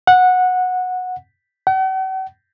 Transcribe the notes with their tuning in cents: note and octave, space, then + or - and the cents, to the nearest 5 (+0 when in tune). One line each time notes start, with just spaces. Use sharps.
F#5 -15
F#5 +45